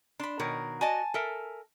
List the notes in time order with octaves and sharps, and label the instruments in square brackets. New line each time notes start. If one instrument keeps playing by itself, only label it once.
[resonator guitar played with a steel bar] D4 [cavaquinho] B5 C6
[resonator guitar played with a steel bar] B2 D#3 A#4 [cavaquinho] C#5
[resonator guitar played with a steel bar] F#4 D5 D#5 [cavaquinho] G#5 A5
[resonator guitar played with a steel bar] A4 A#4 E5